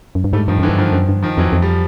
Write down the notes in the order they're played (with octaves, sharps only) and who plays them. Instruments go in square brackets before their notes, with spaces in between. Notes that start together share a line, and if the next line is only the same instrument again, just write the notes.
[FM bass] F#2
G2
[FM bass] G#2 [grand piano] G3 A3
[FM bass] G2 [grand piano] D#3 F3
[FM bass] F#2 [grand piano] D3 E3
[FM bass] G2
[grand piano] D#3 F3
[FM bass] F#2
G2
[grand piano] D#3 F3
[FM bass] F2 [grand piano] E3 F#3
[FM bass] F2
[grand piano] F3 G3